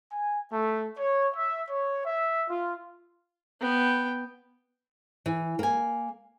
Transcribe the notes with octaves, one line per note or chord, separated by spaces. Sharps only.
G#5
A3
C#5
E5
C#5
E5
F4
B3 G5
E3
A#3 G#5